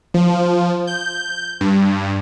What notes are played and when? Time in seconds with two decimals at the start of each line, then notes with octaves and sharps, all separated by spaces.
0.14 F3
0.87 G6
1.61 G2